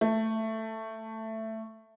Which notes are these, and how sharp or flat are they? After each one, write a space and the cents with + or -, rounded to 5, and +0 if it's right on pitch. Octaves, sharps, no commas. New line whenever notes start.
A3 +10